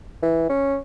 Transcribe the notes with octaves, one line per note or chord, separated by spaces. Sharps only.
E3
C#4